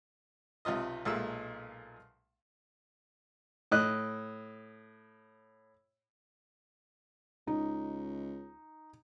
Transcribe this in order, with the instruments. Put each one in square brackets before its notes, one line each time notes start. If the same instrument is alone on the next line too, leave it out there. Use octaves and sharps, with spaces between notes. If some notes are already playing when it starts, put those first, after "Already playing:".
[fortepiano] B1 C3 F4 D#5
B1 A#2 G#3 A3 E6
A2 D#5 F#6
[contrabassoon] C#2 [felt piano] D#4